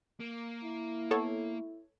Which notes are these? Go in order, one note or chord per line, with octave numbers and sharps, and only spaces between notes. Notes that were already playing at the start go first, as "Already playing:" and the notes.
A#3
E4
B3 A4 C#5